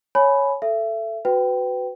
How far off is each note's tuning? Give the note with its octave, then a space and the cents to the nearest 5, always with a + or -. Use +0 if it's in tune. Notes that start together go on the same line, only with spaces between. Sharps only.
C#5 +0 G#5 +20 B5 +0
A4 +0 E5 +30
F#4 +0 B4 +20 G5 -10